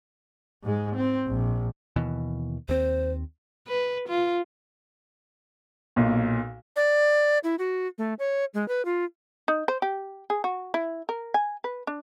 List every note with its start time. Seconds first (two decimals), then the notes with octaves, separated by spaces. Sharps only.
0.63 G#2 G#3
0.96 C4
1.27 A#1
1.96 D#2 B2 E3
2.69 D#2 C4 C5
3.68 B4
4.08 F4
5.96 B1 A#2
6.76 D5
7.44 E4
7.59 F#4
7.98 A3
8.19 C#5
8.54 G#3
8.68 B4
8.85 F4
9.48 D#4
9.68 C5
9.82 G4
10.30 G#4
10.44 F#4
10.74 E4
11.09 A#4
11.34 G#5
11.64 B4
11.87 D4